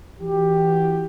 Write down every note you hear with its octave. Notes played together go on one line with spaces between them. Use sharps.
E3 F#4 G4